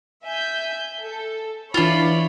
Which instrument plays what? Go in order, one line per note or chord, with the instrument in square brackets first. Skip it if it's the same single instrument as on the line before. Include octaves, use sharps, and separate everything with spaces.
[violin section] E5 G#5 G6
A4
[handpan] E3 E4 [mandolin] D4 F4 [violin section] C#5 D5 B5